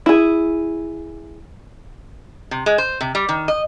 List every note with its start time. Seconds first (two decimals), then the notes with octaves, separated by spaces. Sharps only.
0.06 E4 G#4
2.51 C3
2.66 G#3
2.78 C5
3.01 C3
3.15 G3
3.29 D#3
3.48 D#5